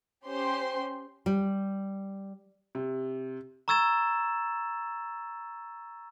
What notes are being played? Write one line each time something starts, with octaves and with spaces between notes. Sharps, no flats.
C#4 G4 C5 C6
G3
C3
A#5 C#6 E6 G#6 A6 E7